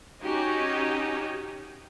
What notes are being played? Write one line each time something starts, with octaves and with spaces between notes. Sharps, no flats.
C#4 D#4 F#4 G4